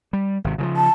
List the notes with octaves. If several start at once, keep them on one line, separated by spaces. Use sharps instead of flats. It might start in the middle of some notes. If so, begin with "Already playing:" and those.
G3
G#1 C3
C#3 E3 F3
A5